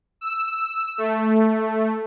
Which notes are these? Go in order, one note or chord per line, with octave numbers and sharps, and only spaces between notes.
E6
A3